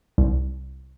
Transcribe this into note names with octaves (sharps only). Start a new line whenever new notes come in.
C2